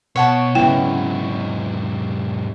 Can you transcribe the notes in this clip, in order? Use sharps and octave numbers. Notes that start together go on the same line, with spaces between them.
B2 C#5 F#5 A5
G#2 C#3 F#3 B3 E4 G5